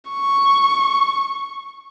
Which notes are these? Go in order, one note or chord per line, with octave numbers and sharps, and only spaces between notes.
C#6